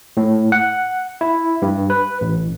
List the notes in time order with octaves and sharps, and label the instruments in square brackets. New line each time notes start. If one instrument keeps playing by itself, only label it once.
[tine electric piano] A2
F#5
E4
G2
B4
A1